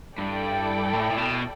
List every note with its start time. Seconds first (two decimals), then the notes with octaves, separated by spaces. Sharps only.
0.18 G2 E4 A4 D5 G5
0.93 A2
1.11 A2
1.18 B2